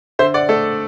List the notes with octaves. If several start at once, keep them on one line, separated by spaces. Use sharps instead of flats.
D3 C5 E5
D5 F#5
A3 A4